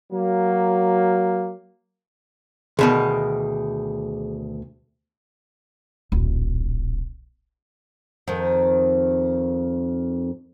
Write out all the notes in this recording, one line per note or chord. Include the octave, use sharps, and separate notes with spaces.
F#3 A#3
D2 B2 D#3 G#4
D1 A#1
F2 D#3